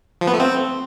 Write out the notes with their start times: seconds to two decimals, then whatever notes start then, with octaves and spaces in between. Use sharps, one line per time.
0.21 F3
0.27 B3
0.34 A3
0.40 C4